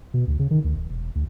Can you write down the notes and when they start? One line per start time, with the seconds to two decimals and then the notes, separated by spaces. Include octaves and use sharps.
0.14 B2
0.27 D2
0.39 C#3
0.51 D#3
0.64 D2
0.76 D1
0.89 E1
1.15 D2